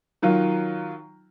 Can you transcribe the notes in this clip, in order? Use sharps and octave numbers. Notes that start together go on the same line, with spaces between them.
D#3 F#3 F4